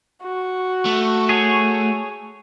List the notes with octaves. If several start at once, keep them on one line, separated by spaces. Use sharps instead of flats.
F#4
A3
G#4 C#5